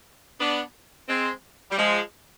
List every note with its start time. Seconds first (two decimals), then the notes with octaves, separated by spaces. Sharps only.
0.39 B3 D4
1.08 G#3 C4
1.70 G3
1.77 F3 G#3